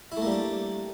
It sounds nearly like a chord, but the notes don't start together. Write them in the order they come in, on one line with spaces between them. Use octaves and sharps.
E4 A3 A#3 G3 D4